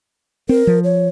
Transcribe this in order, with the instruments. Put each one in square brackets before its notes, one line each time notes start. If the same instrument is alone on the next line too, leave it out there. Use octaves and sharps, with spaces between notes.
[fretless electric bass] C4 [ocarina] A#4
[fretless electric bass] F3
[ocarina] C#5